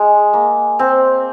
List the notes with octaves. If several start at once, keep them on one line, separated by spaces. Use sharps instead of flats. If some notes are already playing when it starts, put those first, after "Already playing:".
Already playing: G#3
A#3
C4